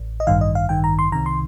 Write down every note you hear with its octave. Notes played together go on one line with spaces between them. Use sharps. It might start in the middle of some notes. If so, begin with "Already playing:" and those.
Already playing: A1
D#5
A1 G2 D#3 F5
D#5
F5
A1 G2 D#3 G5
A#5
C6
C2 C3 D#3 A#5
C6